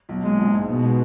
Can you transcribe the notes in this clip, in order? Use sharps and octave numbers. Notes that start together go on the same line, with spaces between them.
B1
A#2 G#3
A#1
G#2
B2 B3
G#3